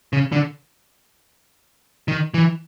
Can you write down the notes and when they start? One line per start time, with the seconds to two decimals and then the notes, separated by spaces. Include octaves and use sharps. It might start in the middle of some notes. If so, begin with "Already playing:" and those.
0.13 C#3
0.32 D3
2.08 D#3
2.34 E3